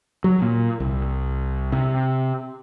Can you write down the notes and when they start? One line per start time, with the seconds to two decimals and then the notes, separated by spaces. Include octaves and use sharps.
0.24 F#3
0.42 A#2
0.80 C2
1.72 C3